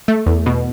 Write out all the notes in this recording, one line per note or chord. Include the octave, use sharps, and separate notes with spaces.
A3
E2
B2